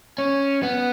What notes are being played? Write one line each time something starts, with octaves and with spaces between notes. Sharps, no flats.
C#4
B3